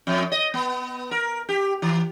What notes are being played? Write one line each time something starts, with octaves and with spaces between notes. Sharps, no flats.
F2
D#5
B3
A#4
G4
E3